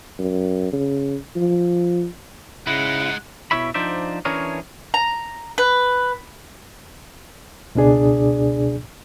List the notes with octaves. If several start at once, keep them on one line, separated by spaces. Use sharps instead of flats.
F#2
C#3
F3
C#3 G#3 D#4 E4 F#5
B2 G#3 E4 C#5 E5 B5
F3 D4 D#4 C5 D5 E5
E3 C#4 D4 G#4 A#4 C#5
A#5
B4
C#2 B2 D4 G#4 D5